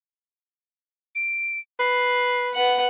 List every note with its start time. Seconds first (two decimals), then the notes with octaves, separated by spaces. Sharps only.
1.15 D7
1.79 B4 C7
2.54 B4 F#5